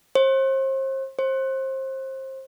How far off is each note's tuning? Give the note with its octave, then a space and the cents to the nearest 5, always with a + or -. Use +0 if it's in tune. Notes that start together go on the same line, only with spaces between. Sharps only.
C5 +35
C5 +25